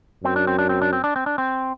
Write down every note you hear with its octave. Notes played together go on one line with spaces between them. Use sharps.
F#2 C4
D4
C4
D4
C4
D4
C4
D4
C4
D4
C4